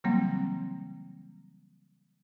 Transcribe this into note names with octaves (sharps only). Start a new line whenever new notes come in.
C#3 E3 F#3 G3 A#3 C4